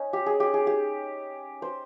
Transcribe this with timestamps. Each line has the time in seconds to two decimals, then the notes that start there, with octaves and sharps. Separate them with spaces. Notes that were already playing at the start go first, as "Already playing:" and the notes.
Already playing: C#4 D#4
0.13 G4
0.26 G#4
0.40 G4
0.54 G#4
0.67 G4
1.62 C5